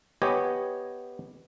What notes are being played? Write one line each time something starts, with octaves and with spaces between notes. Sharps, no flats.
B3 G4 C#5 D#5 G#5